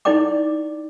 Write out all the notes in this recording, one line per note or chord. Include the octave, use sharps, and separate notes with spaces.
D#4 E4 D5 G5 D6